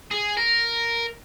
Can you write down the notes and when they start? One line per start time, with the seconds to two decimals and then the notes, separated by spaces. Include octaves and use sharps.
0.11 G#4
0.37 A#4